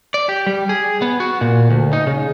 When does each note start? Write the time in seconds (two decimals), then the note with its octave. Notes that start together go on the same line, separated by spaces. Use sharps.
0.14 D5
0.29 G4
0.47 G3
0.69 G#4
1.02 B3
1.20 F#4
1.41 A#2
1.71 D2
1.93 D#4
2.07 C#3